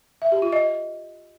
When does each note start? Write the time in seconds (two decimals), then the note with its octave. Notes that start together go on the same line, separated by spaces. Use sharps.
0.22 E5
0.32 G4
0.42 F4
0.52 D#5